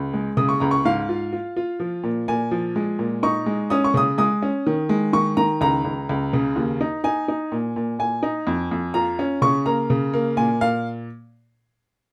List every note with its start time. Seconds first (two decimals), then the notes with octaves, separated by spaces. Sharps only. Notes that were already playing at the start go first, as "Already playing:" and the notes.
Already playing: C#2
0.14 G#3
0.37 C#3 D#6
0.49 C#6
0.60 C#2 A#5
0.71 C#6
0.85 G#2 F5
1.09 F4
1.33 F4
1.56 F4
1.80 F3
2.03 A#2
2.28 A#2 G#5
2.51 F3
2.76 G#3
2.99 A#2
3.23 D#4 C#6
3.46 G#3
3.70 C#4 D#6
3.84 C#6
3.94 C#3 D#6
4.18 G#3 D#6
4.42 C#4
4.67 D#3
4.89 G#3
5.13 D#3 C#6
5.37 D#3 A#5
5.61 C#2 A#5
5.85 C#2
6.09 C#2
6.33 C#3
6.56 D#2
6.81 D#4
7.04 D#4 G#5
7.28 D#4
7.52 A#2
7.76 A#2
7.99 A#2 G#5
8.23 D#4
8.47 F2
8.71 F2
8.94 F4 A#5
9.19 C#4
9.42 C#3 C#6
9.66 A#3 A#5
9.90 C#3
10.14 A#3
10.37 A#2 G#5
10.61 A#2 F5